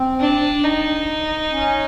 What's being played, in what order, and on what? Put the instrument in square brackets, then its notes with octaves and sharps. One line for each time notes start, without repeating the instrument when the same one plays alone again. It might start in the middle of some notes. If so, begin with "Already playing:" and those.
Already playing: [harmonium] C4
[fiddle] D4
D#4
[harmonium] C#4